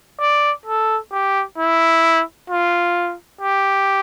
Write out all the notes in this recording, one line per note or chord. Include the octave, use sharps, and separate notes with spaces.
D5
A4
G4
E4
F4
G4